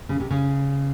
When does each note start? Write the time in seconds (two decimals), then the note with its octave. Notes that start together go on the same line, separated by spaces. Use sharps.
0.09 C#3
0.20 C3
0.30 C#3